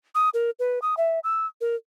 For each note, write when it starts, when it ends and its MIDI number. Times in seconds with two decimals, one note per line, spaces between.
0.15 0.29 87
0.34 0.50 70
0.59 0.79 71
0.82 0.95 87
0.97 1.20 76
1.24 1.46 88
1.61 1.75 70